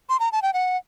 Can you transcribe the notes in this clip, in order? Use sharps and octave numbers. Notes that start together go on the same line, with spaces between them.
C6
A#5
A5
G5
F#5